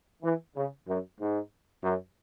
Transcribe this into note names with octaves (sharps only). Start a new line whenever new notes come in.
E3
C#3
F#2
G#2
F#2